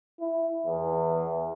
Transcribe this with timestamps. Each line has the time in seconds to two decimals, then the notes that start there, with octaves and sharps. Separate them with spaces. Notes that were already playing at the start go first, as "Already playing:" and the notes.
0.19 E4
0.66 E2